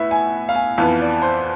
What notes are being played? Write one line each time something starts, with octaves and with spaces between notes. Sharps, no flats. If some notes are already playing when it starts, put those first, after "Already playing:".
Already playing: A2 B3 E5
G#5
F5
G#5
F2 E3 B3 F5
D5
C5